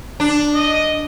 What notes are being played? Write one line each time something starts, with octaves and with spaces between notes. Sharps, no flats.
D4
D#5